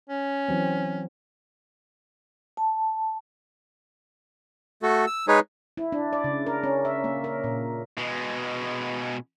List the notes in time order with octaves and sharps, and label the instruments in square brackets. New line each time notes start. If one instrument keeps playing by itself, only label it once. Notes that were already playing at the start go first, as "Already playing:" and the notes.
[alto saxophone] C#4
[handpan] E3 F#3 C4
[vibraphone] A5
[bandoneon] A3 F#4 A4
E6
G#3 D#4 G#4 B4 C#5
[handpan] E4
D4
D5
C#3
A#4
C#4
E5
A#3
A#4
A#2
[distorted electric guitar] B2 G#3